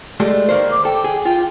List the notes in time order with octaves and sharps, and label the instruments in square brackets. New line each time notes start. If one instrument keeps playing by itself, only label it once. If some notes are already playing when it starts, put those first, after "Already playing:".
[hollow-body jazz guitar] G#3 A3 G4 [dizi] D5
[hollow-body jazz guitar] D#3 A#3 C5
[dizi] D6
[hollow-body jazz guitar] A4 [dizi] G5
[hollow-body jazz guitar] G#4
[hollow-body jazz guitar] F4 [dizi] G5